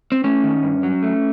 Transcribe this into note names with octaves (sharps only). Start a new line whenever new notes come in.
C4
A3 C#4
D#3
G2
F#3
A3